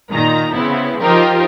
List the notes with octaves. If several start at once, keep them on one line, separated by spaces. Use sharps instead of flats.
A#2 D#3 D#4 A#5
C#3 B3 C4 E4
F3 D#4 F4 G4 A#4 C5